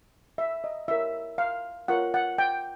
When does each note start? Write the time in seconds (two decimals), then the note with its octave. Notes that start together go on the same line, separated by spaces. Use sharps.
0.38 E5
0.64 D#5
0.88 E4 G4 A#4 C#5 E5
1.38 F5
1.88 F4 A#4 C#5 F#5
2.14 F#5
2.38 G5